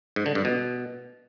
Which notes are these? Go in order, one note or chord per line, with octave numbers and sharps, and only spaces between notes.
G#2
D3
G2
B2